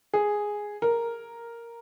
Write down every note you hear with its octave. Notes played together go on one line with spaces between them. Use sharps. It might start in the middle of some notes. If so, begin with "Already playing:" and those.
G#4
A#4